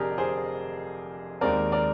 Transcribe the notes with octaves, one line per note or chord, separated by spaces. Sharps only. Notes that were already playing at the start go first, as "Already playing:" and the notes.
Already playing: F1 F2 D3 G4 G#4 A#4 D5 D#5
G#4 C5
D#2 D#3 G#3 C4 A#4 D5
A#4 D5